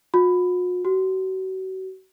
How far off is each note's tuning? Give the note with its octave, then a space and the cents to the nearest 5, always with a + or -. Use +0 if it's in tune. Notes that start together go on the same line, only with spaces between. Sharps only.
F#4 -45
F#4 +35